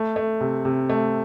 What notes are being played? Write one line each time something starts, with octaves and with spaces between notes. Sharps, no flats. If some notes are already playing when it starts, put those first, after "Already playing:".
Already playing: A3
A3
C3
C3
A3